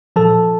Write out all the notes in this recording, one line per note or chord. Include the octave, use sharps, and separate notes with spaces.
A#2 F3 A4 A5